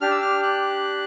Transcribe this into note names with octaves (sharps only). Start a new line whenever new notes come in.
D4 G4 F6
E6
F6
F#6